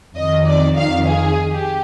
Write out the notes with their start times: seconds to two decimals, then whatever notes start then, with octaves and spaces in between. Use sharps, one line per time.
0.15 F2 D#3 D#5
0.46 D5
0.76 F5
1.06 G#4
1.51 G4